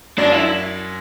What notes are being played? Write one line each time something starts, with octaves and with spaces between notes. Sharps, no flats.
F#2 F#3 D4
E4